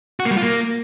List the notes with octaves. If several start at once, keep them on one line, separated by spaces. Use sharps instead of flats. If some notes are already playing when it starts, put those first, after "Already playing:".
F#4
A#3
G3
F4
A#3